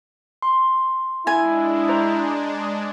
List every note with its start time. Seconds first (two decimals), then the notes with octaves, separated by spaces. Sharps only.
0.42 C6
1.27 G#3 D4 E4 G#5
1.89 C5 A#5